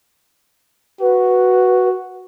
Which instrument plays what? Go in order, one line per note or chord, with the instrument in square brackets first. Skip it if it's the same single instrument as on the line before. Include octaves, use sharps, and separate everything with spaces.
[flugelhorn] F#4 [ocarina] B4